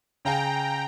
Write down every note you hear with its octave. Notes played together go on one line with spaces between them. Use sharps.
C#3 F5 G5 G#5 A#5